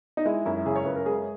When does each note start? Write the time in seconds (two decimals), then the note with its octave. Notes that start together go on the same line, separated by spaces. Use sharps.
0.17 D#4
0.25 G#3 E4
0.46 F#2 E4
0.66 C#3 G#4
0.76 C#5
0.85 F#2 B4
0.96 A#4
1.06 G#3 G#4